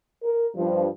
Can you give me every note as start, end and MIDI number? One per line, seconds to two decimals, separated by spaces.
0.23 0.46 70
0.55 0.85 43
0.55 0.85 53